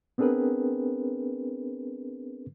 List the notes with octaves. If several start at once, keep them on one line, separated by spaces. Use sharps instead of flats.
B3 C4 D4 G#4 A#4 B4